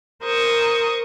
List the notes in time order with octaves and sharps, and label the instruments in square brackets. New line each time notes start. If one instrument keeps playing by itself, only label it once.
[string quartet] A#4 C5 C#6 D#6